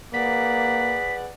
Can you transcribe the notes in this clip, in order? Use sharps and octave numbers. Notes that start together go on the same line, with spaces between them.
A#3 G#4 B4 D5 F#5 B6